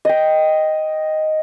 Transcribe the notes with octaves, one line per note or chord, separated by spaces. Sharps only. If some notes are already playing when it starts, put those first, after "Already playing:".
D#5 G5